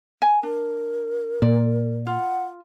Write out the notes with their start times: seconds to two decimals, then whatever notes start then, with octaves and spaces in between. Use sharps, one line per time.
0.22 G#5
0.43 D4 A#4
1.42 A#2 D5
2.07 F4 F#5